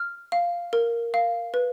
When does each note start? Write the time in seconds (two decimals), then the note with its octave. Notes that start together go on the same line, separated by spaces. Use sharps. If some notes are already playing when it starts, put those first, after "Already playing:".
Already playing: F6
0.32 F5
0.73 A#4
1.14 F5
1.54 B4